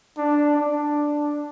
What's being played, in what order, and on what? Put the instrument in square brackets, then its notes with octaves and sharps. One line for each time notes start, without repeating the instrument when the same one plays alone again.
[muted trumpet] D4
D4